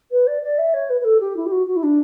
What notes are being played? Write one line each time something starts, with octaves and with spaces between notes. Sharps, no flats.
B4
D5
D5
E5
C#5
B4
B4
A4
G4
E4
G4
F#4
F#4
E4
D4